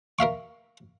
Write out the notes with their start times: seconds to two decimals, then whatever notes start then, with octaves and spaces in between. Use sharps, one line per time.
0.19 A#4 E5 F5 C#6